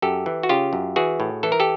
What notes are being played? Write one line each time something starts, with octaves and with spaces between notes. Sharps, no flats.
F#2 G4 A4
E3
F#4
C#3 F4 G4
F#2
E3 F#4 G#4
A2
E3 A4
A#4
G4 A4